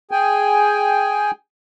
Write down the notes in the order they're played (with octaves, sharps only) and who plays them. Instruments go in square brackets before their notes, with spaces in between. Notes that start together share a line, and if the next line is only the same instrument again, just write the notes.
[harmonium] G#4 G5 G#5